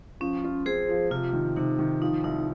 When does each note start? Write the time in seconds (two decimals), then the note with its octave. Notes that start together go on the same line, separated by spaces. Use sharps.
0.21 F3 C#4
0.44 F4
0.66 C4 G#4 C5
0.89 F3
1.11 C3 F4
1.33 D#3
1.56 C3 D#4
1.79 D#3
2.01 F3 D#4
2.23 C2 D#4